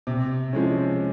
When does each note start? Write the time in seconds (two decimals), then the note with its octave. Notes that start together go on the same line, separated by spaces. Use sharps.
0.07 C3
0.53 F3 G#3 C#4